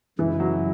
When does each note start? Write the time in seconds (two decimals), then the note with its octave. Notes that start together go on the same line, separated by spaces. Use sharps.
0.19 F#2 C#3 E3 G#3 E4
0.40 F#3